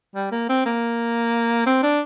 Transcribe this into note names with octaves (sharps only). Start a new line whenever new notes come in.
G3
A#3
C4
A#3
C4
D4